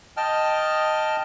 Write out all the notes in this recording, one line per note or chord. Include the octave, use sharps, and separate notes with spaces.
D#5 G5 A5 F6